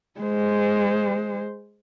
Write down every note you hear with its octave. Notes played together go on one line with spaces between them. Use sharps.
G#3 C5